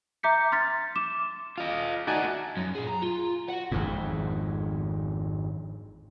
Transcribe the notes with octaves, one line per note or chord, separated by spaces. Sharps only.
E5 A#5 D6 G6 B6 C#7
C6 F6 A6 B6
D6 E7
F4 D#5
A3 D#4 F#4 D5 G#5
F#2
A#2 G#4
A#5
F4
F#4 F#5
G#1 F2 G#2